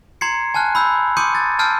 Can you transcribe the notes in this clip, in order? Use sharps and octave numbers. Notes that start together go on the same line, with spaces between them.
A#5 C6 G#6 C7 C#7
G#5 A5 F6 F#6
B5 E6 G6
C6 D6 D#6 G6 C#7 D#7
G#6 A6
A5 E6 F6 G6 C7 D7